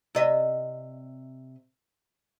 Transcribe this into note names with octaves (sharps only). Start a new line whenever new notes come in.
C3 D#5 E5